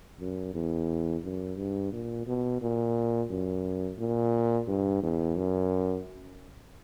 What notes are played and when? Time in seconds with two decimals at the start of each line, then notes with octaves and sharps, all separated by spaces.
0.20 F#2
0.55 E2
1.24 F#2
1.58 G2
1.92 A#2
2.27 B2
2.62 A#2
3.30 F#2
3.99 A#2
4.68 G2
5.03 E2
5.37 F#2